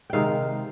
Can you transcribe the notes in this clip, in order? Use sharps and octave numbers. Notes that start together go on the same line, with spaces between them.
C3 D#3 G#3 F5 G5